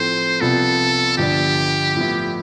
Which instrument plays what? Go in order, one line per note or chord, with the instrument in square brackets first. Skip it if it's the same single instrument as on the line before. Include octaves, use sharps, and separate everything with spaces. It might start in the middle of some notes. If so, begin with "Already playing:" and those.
Already playing: [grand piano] A2 F3 A3 C4 [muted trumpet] C5
[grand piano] C2 C3 F3 B3 F4 [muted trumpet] A4
[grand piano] G1 G2 F3 B3 D4 [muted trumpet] G4
[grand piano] A2 F3 B3 E4